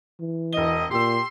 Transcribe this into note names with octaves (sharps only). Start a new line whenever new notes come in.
E3
E1 D#5 G7
A#2 G4 C6 E6